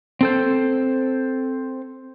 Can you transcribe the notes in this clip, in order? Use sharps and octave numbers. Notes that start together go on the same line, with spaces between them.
C4 A4 C5